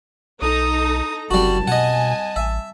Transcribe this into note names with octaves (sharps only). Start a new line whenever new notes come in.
B1 D#4 A4 A#5 D#6
F#1 C2 F#2 G3 F#4 A5
B2 D#5 F#5 G#5
A1 E5